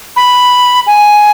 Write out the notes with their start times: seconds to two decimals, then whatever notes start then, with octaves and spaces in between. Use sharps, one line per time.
0.16 B5
0.87 G#5